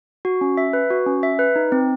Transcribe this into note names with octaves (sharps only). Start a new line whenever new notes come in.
F#4
C#4
E5
B4
F#4
C#4
E5
B4
D#4
C4